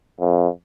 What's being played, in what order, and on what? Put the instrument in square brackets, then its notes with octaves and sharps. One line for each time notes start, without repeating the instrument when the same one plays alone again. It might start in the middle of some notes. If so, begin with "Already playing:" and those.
[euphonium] F2